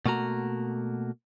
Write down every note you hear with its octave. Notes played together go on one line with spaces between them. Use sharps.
B2 A3 A#3 F#4 A#5